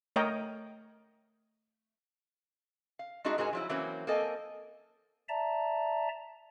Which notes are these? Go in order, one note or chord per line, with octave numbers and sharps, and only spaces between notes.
A3 A#4 C#5 D#5 G5
F5
G#3 A3 D4 D#4 F#4 G#4
G#2 G#3 F#4 G#4 A#4 G#5
F3 F#3 E4
E3 F#3 A#3 C4 C#4
A#3 C4 A4 D#5 G#5
D5 E5 A5 A#5